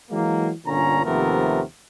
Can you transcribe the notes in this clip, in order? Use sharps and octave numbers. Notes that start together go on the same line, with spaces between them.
E3 F#3 G#3 A#3
G1 A#2 D3 C#4 A#5
D#2 C3 F3 A3 B3 A#4